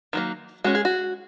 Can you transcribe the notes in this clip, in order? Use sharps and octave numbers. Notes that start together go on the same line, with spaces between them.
D#3 F#3 A#3
G#3 C#4 F#4
G#4
F#4